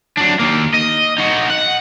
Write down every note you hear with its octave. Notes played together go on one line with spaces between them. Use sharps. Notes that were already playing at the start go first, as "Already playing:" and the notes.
F#3 D4
D#2 A#3
D#5
D#4 F#4
F#5